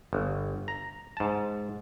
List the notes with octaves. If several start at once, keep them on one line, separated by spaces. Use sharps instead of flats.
G1
A#5
G#2 A5